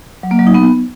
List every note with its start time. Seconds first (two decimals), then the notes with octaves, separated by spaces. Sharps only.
0.23 F#3
0.31 A#3
0.39 F#3
0.47 D#4
0.54 B3